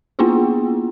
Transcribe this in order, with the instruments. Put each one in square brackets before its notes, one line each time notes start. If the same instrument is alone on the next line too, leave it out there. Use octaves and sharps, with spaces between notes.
[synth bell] A#3 B3 D4 E4 F4 G#4